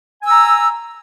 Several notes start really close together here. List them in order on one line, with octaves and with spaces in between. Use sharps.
G#5 E6 A#5